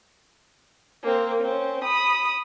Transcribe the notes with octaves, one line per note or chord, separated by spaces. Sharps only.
A#3 C4
C4 C#4
B5 D#6